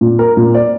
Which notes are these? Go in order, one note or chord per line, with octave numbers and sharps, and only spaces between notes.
A#2
A#4
A#2
D5